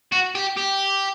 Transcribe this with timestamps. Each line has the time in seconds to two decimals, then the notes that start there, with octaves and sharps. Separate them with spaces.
0.12 F#4
0.35 G4
0.56 G4